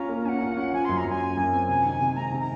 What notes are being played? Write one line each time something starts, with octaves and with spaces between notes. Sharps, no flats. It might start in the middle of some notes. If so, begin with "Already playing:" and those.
Already playing: C#4 F4 A#5
A#3
C#4 F#5 G#5
F4
C#4
F3 G#5
F#2 C6
A#5
F#2 G#5
F#2
F#2
C4
C3 G#5
D#3
C3
G#3 A#5
C3
A#5